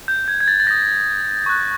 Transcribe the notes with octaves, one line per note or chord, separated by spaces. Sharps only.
G6
G#6
G#6
A6
A6
D#6 G6 A#6
C#6 F#6